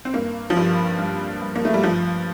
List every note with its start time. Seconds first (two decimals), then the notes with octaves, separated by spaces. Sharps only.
0.05 C4
0.14 G2 A#3
0.50 F3
0.57 G2 G3
0.98 G2
1.42 G2
1.56 A#3
1.65 A3
1.74 G3
1.83 G2 F3